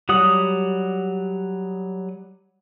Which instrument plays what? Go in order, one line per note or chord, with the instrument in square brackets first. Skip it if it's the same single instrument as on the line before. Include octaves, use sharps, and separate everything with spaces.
[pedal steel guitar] F#3 G3 F#5 D#6